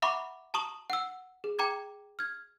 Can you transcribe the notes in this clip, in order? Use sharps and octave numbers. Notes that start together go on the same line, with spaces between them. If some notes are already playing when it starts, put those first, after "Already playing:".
E5 F#5 A#5 B5 C#6 D6
A5 A#5 C#6 D#6 E7 F#7
F#5 E6
G#4
G5 A#5 D6 G#6
F6 G#6